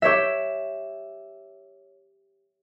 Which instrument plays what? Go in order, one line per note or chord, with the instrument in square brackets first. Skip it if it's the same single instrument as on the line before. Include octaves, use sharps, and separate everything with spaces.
[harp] G4 C#5 E5